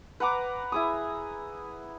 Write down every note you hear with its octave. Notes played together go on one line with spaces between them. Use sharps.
B4 F#5 A#5 D6
E4 G#4 D#6